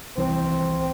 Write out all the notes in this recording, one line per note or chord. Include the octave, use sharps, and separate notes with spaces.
C2 E3 C4